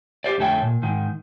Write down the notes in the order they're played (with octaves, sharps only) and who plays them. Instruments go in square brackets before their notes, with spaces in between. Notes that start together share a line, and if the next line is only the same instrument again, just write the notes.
[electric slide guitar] G4 C5 D5
F2 D3 A3 A4 C#5 G5
A#2
G#2 D#3